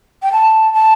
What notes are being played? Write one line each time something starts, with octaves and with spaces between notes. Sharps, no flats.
G5
A5
A5